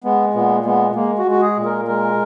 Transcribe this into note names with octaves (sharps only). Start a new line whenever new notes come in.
G#3 B3
A#2 B3
G#3 B3
G#3 A#3
F#4
G#3
F#4
G#4
A#2
A#4
G#3 A#4